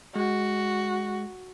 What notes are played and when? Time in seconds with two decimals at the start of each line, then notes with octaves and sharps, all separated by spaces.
0.16 G#3 F#4